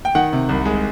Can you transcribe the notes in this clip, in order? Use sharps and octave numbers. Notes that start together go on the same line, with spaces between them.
G5
D#3 F#5
C3
C2
G#3